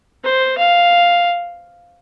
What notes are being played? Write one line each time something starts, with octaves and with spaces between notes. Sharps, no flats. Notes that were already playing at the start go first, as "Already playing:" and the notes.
C5
F5